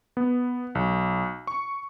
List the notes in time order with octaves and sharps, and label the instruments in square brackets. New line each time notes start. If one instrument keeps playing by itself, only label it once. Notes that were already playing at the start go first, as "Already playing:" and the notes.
[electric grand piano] B3
B1
C#6